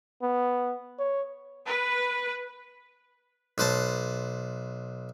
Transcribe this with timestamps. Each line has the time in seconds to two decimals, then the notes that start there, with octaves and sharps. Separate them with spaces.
0.22 B3
0.99 C#5
1.66 B4
3.58 B1 B4 C5 A5